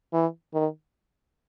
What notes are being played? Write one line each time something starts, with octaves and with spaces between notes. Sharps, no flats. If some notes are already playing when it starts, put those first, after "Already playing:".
E3
D#3